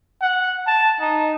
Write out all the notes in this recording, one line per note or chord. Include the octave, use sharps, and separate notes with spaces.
F#5
A5
D#4